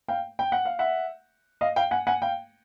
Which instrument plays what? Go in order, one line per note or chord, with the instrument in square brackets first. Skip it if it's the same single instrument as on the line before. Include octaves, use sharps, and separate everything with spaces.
[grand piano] F5 G5
G5
F#5
F5
E5 F#5
D#5 F5
F5 G5
F#5 G#5
F#5 G#5
F5 G5